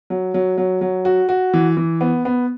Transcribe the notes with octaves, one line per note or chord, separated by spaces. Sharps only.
F#3
F#3
F#3
F#3
F#4
F#4
E3
E3
B3
B3